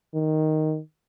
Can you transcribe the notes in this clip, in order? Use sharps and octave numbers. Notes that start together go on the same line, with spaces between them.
D#3